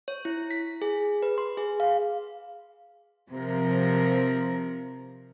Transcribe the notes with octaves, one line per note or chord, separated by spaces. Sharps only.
C#5
E4
B6
G#4
B4
C6
G#4
F5
C3 F3 A#4